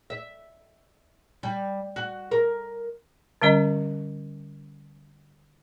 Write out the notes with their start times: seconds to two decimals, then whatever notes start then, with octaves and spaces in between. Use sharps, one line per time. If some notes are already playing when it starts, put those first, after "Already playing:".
0.10 E5
1.43 G3
1.96 F#4
2.31 A#4
3.42 D3 G3 C#4 D#5